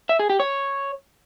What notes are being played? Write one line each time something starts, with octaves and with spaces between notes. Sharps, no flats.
E5
G#4
G4
C#5